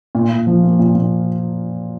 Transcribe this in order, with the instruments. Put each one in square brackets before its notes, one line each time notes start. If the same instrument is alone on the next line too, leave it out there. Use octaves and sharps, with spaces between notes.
[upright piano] A#2
A#2
F3
A#3
A#2
A#2